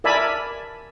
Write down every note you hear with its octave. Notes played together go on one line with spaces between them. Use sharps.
A#4 D5 E5 G#5 A5 B5